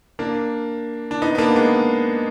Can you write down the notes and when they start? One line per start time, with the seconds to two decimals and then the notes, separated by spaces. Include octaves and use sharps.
0.19 A#3 D4
1.11 D4
1.22 B3 D#4
1.35 B3
1.38 A#3 D4
1.56 G#3 B3